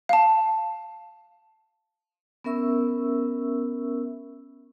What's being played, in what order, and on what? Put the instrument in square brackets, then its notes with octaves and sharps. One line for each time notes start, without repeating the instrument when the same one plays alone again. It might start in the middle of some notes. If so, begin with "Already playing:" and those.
[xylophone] F5 A5
[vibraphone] B3 C#4 A#4 E5 C#6 E6